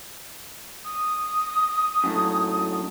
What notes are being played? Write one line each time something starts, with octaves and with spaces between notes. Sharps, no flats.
D#6
F#2 A2